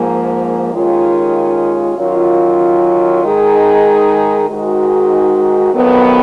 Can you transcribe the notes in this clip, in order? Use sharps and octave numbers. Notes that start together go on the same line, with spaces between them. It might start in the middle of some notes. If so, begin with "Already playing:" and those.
Already playing: G#2 F3 A#3
D#2 D#3 G#3 C#4 F4
F#2 D#3 F#3 C#4 F4
D#3 G#3 D#4 G#4
G#2 D#3 G#3 D#4 F#4
F2 D#3 F#3 B3